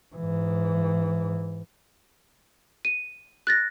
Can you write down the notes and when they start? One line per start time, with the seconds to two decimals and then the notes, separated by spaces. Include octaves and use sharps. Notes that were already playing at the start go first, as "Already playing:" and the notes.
0.15 G#2 E3
2.85 D#7
3.47 F#6 A6 A#6